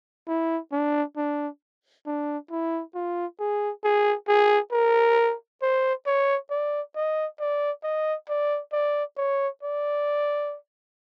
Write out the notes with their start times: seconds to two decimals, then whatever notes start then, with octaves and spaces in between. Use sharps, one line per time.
0.28 E4
0.72 D4
1.17 D4
2.06 D4
2.51 E4
2.95 F4
3.40 G#4
3.84 G#4
4.28 G#4
4.72 A#4
5.62 C5
6.06 C#5
6.50 D5
6.95 D#5
7.40 D5
7.84 D#5
8.29 D5
8.73 D5
9.17 C#5
9.63 D5